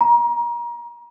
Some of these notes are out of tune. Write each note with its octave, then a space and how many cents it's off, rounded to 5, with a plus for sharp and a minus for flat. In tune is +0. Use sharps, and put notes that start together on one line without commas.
A#5 +30